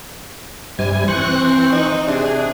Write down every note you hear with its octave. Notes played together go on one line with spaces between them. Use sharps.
G2 C3 G3 G#5
E3 C4 C5 C#6 F#6
D#4
C3 D4 G#4